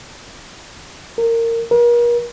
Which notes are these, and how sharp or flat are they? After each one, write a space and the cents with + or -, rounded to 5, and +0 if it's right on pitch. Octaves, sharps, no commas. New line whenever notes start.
A#4 -20
A#4 +40